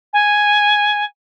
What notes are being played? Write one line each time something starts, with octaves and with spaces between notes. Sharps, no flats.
G#5